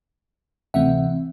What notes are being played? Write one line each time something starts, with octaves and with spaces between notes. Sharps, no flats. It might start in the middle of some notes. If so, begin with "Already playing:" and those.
D2 C3 E3 A3 C4 E5 F#5